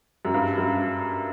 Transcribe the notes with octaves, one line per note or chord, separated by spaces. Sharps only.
F#2
G2
F#2